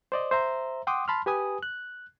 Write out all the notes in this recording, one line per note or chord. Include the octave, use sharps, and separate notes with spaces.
C5 D5 D#5
C5 E5 A#5
F#5 G5 C6 D6 D#6
A5 B5 C6 F6
G4 B4 G#5 D#6
F#6